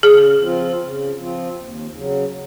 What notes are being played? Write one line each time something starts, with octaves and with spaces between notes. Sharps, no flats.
C#3 G#4
F3 C4 F4
C#3
F3 C4 F4
D#2
C#3 F#3